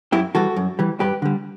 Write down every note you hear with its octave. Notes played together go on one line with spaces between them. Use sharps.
F#2 E4 G4
E3 G3 F#4 A4
F#2
E3 G3
G2 G4 B4
D3 G3